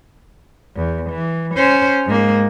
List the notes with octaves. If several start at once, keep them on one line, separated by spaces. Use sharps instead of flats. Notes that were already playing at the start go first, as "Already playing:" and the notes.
E2
E3
C#4 C5
G#2 A#3